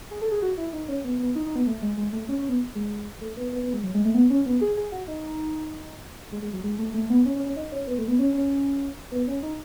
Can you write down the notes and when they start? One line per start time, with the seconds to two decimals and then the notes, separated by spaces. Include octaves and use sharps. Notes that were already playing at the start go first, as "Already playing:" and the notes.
0.11 G#4
0.21 A4
0.32 G#4
0.42 F#4
0.58 E4
0.73 D#4
0.88 C#4
1.04 B3
1.19 B3
1.35 D#4
1.46 D#4
1.56 B3
1.67 A3
1.82 G#3
1.97 G#3
2.13 A3
2.29 C#4
2.39 C#4
2.49 B3
2.75 G#3
3.21 A3
3.37 B3
3.53 B3
3.63 B3
3.73 G#3
3.84 F#3
3.94 G#3
4.05 A3
4.14 B3
4.30 C#4
4.46 B3
4.61 G#4
4.77 G#4
4.92 F#4
5.08 D#4
6.32 G#3
6.42 G#3
6.53 F#3
6.64 G#3
6.79 A3
6.94 A3
7.10 B3
7.25 C#4
7.36 C#4
7.46 C#4
7.56 D#4
7.72 C#4
7.87 B3
7.98 A3
8.08 B3
8.19 C#4
8.34 C#4
9.12 B3
9.27 C#4
9.43 D#4